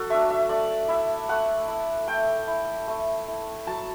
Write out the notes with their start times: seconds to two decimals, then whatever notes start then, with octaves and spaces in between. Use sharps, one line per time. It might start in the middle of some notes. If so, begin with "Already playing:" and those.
Already playing: F#3 F#4 A4
0.10 A3 D4 E5
0.30 E5
0.49 A3 D5
0.89 E4 E5
1.29 A3 F#5
1.68 E4
2.08 A3 G5
2.47 E4
2.88 A3
3.28 E4
3.67 F#3 A5